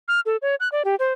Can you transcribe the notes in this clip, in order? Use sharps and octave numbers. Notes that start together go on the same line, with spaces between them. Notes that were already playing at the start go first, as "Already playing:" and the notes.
F6
A4
C#5
F#6
D5
G4
C5